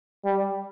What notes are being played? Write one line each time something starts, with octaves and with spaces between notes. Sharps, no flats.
G3